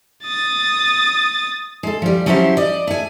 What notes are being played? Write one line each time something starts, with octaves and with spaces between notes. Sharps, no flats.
D#6 A6
G#3 A4
F3 G3
F3 F#3 C#4 E4 G4 C5
D5 D#5
A3 G#5